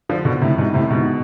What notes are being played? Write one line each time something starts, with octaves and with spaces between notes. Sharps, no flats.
D3 F3
B2 D3
A2 C3
G#2 B2
A2 C3
G#2 B2